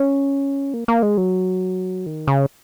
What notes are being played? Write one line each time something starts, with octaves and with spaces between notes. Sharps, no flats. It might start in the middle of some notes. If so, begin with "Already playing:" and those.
Already playing: C#4
A#3
A#3
G#3
F#3
D#3
C#3